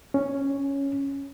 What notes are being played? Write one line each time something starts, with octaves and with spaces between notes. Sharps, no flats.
C#4